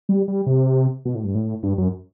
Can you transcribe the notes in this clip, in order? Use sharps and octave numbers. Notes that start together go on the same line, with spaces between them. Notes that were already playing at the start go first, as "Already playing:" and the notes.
G3
G3
C3
B2
A2
G2
A2
G2
F#2